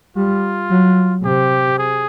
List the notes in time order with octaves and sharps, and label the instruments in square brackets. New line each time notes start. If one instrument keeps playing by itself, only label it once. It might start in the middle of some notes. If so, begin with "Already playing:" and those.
[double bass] G3 [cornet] F4
[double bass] F#3
[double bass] C3 [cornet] G4
[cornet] G#4